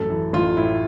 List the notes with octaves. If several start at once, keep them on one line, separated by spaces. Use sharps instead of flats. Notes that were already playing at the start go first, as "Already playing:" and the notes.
Already playing: A1 F#2 A4
E3
A1 F4
A2 E4